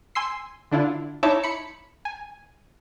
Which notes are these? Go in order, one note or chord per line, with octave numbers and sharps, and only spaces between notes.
G#5 C6 E6 C7
D3 D4 E4 F4
D#4 E4 C#5 E5 A5 D6
B5 C#7
G#5